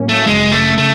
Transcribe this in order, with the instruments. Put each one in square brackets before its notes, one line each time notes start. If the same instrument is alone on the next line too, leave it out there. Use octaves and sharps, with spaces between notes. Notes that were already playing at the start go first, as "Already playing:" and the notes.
Already playing: [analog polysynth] A2 F#3 A#3 C#4
[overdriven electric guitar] A3
[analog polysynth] G#1 F#2 C#3 [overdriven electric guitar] G#3
[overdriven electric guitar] A3
[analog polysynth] C#3 [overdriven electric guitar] A3